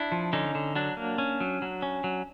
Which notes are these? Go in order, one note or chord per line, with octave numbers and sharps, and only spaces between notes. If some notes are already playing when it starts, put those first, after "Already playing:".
Already playing: D4 E4
F3
D3 C#4 D#4
D3
F#3 D4
A#3
C#4
F#3
F#3
C#4
F#3